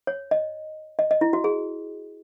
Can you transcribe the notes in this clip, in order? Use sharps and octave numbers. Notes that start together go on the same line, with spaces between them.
C#5
D#5
D#5
D#5
E4
F#4
G#4